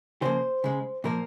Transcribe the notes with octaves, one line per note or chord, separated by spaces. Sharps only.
C#3 F3 A#3 C5
C#3 G#3
A#2 F3 A#3 A#4